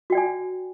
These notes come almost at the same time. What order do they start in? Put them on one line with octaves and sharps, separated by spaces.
F#4 G5 D5 G#5